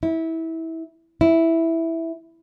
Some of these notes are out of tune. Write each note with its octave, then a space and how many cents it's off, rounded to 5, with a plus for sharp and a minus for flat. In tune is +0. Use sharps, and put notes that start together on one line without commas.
E4 -20
E4 -5